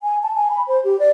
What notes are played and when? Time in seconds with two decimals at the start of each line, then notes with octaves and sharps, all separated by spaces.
0.03 G#5
0.23 A5
0.34 G#5
0.50 B5
0.67 C5
0.84 G4
1.00 D5